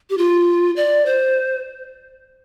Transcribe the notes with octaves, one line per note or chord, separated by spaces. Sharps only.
G4
F4
D5
C5